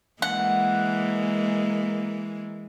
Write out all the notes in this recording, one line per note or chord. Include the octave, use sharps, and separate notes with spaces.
E3 G#3 A#3 F#5